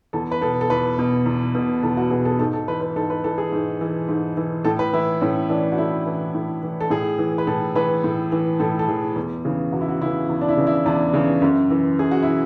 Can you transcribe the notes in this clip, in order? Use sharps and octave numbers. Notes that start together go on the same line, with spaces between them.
E2 A4
B4
B2 A4
A4
E2 B4
B2
E2
B2
E2 A4
F#4
B2 G#4
A4
G#2 A4
A4
E3 B4
B4
G#2 A4
B4
E3 A4
G#4
G#2
E3
G#2
E3
A2 A4
B4
E3 E4
A2 C#4
E3 D4
F#4
A2 E4
E3
A2
E3
A4
A2 G#4
E3
B4
A2 A4
E3 B4
A2
E3
A2 A4
A4
E3 G#4
E2
C#3 E3
E2 F#4
E4
F#4
C#3 E3 E4
E2
D4
E4
C#3 E3
E4
E2 D4
C#3 E3
F#2
E3
F#2 G#4
F#4
E3 E4